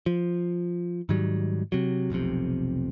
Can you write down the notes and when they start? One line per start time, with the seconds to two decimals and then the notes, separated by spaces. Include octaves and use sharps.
0.06 F3
1.09 G#2 D#3 F#3 G3
1.72 C3 F#3
2.10 F1 B1 F2 C3